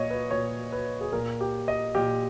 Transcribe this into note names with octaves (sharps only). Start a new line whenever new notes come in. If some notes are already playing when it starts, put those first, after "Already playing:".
Already playing: A#2 C#5 D#5
B4
A#2 C#5
B4
G#4
A#2 A#4
G4
D#5
A#2 G4